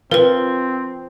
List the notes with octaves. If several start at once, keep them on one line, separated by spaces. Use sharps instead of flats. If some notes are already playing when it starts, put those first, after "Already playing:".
F3 C4 A#4 B4